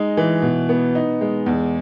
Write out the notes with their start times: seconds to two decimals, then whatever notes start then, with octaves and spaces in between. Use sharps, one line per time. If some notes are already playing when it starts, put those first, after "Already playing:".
Already playing: G#3 D#4
0.17 E3
0.42 B2
0.69 B3
0.95 D#4
1.21 G#3
1.46 E2